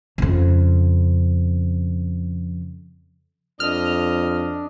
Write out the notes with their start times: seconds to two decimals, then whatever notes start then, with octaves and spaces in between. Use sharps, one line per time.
0.18 F2 C#3
3.60 F2 D4 D#5 F6